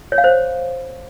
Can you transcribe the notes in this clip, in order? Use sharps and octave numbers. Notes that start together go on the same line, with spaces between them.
C#5
F5
C5